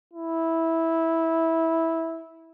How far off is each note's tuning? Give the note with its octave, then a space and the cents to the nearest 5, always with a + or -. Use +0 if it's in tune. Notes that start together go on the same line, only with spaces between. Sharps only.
E4 -10